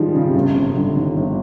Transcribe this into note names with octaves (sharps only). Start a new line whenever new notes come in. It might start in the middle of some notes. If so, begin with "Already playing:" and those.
Already playing: D#3 F3 G3 G#3
C#3
C3
G1 C#3
C3
G1 D3
D#3
G1